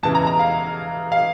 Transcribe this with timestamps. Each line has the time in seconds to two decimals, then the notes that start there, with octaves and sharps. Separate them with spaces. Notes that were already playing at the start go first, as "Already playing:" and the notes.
0.03 E2 C#3 E3 A5
0.15 A#5
0.27 A#5
0.39 F5
1.12 F5